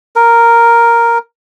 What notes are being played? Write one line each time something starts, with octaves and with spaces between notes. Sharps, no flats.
A#4